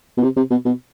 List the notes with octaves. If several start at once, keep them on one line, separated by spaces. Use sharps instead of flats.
B2
C3
C3
B2
B2